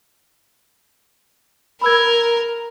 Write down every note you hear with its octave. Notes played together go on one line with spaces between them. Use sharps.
A#4 B5 E6 G#6